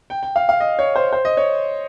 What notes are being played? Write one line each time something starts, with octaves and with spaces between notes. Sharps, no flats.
G5
G5
F5
F5
D#5
C#5
C5
C5
D#5
C#5